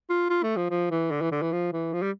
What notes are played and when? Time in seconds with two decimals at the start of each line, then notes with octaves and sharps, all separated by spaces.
0.10 F4
0.30 F4
0.43 A3
0.57 F3
0.70 F3
0.91 E3
1.11 D3
1.21 E3
1.31 D3
1.42 E3
1.52 F3
1.73 E3
1.93 F3
2.02 G3